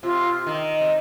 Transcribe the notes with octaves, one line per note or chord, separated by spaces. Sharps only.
C3 F4
D#3
C3